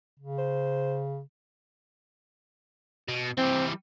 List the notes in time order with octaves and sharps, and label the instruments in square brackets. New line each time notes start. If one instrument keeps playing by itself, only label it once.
[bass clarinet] C#3
[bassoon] C5
[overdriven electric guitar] B2
[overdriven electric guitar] E3 G3 [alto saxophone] C4